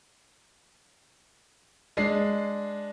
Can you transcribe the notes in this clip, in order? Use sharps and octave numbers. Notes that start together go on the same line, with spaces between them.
G#3 D4 C7